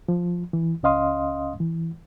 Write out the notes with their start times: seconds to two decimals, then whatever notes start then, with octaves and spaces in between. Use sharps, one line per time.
0.08 F3
0.53 E3
0.83 C#2 C#4 D#5 F5 C6 D#6
1.60 E3